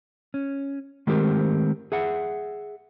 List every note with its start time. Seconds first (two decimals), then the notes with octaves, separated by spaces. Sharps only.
0.34 C#4
1.07 D#3 G#3 A3 C4 G4 A#4
1.92 G#4 E5 F#5